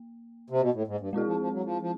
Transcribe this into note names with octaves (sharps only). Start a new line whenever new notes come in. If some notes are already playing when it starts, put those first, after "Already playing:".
Already playing: A#3
C3
B2
A2
G#2
G2
B2 G#3 C4 E4 G#4
F3
F3
F#3
F3
F3